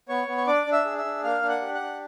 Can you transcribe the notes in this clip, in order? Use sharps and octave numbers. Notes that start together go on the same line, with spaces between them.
B3 C#5 C#6
B3
C#6
D4 D5 D6
D4
E5 E6
G#4
E5 E6
D4
A#3 F5 F6
D4
F#5 F#6
G4
F#5 F#6
D4